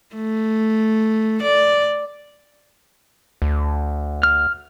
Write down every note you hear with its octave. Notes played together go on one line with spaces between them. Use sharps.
A3
D5
D2
F6